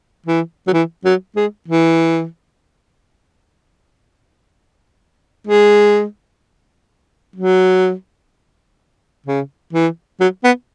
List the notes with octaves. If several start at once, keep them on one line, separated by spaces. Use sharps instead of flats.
E3
F#3
E3
F#3
G#3
E3
G#3
F#3
C#3
E3
F#3
B3